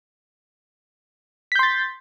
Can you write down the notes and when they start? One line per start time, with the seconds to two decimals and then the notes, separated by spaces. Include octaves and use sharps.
1.52 B6
1.55 G6
1.59 C6
1.63 A6